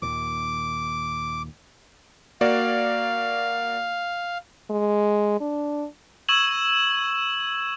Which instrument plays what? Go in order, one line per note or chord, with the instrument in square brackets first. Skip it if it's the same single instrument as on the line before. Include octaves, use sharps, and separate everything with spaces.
[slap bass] D#2 A#2 D#3 [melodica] D6
[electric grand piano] A#3 F#4 D5 [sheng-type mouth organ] F5
[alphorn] G#3
D4
[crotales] C#6 E6 G#6 E7 F#7